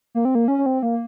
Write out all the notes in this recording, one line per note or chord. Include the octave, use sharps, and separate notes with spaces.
A#3
C4
A#3
C#4
C#4
C4
A#3